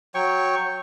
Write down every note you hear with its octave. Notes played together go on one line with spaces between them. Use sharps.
F#3 C#5 G5 C#6